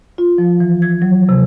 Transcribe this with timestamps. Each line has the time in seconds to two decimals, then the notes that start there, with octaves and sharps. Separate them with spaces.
0.18 F4
0.38 F3
0.60 E3
0.82 G#6
1.02 F#3
1.29 C3